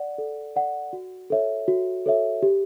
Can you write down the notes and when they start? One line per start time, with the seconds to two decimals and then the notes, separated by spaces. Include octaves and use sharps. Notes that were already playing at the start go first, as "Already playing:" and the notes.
Already playing: D5 F#5
0.18 A4
0.56 D5 F#5
0.93 F#4
1.30 A4 C#5 E5
1.68 F#4
2.06 A4 C#5 E5
2.43 G4